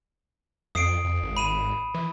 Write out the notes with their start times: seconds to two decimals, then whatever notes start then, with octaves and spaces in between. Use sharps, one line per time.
0.75 F2 D#6 C7 D7
1.04 F2
1.23 G#1
1.37 B5 D#7 E7
1.94 E3